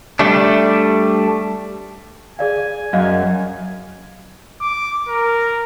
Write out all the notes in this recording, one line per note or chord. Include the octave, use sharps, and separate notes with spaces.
G3 A3 D4
G#4 D5 F5 G#5
F#2 D#5 F5
D6
A#4